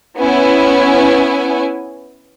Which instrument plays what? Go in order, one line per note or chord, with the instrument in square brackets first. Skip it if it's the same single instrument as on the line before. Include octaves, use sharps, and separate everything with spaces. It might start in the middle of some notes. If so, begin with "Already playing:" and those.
[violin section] B3 C#4 E4 G#5